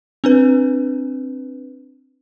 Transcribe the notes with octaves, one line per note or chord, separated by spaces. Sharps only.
C4 D4 B4